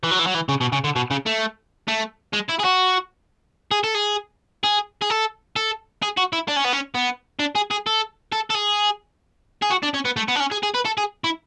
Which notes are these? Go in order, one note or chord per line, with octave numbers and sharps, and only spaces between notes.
E3
F#3
E3
F#3
E3
C#3
B2
C#3
D3
B2
C#3
A3
A3
G#3
E4
G#4
F#4
G#4
A4
G#4
G#4
G#4
A4
A4
G#4
F#4
E4
D4
C#4
B3
C#4
B3
D4
G#4
G#4
A4
A4
A4
G#4
G#4
F#4
D4
C#4
B3
A3
B3
D4
C#4
G#4
G#4
B4
A4
G#4
E4